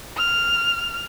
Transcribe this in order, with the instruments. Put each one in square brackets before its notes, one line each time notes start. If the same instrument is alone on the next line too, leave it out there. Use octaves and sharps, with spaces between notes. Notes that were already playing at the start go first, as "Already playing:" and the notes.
[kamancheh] F6